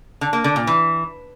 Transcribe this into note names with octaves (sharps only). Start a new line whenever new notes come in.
D3
A#3
D3
A#2
E3